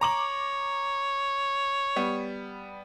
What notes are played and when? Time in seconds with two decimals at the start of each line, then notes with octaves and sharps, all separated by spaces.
0.01 C#5 A#5 D6 F#7
1.96 G3 B3